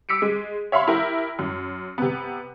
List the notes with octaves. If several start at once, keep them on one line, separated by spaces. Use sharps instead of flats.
D6 E6 B6 C#7 D7
G#3
C#5 E5 F5 B5 C6
E4 G4 A#4
F#2
C3 B3